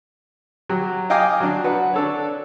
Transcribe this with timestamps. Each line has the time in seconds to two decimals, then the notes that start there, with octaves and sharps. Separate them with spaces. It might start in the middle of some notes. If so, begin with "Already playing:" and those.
0.70 F#3 G4
1.10 D#5 F5 G5 G#5 D6 D#6
1.40 F#3 D4
1.63 F#4 B4 F#5
1.94 D4 A4 C#5